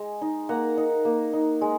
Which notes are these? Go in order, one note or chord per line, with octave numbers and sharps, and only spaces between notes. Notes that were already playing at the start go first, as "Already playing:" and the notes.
Already playing: G#3
D#4
A#3 F#5 A#5
D#4
A#3
D#4
G#3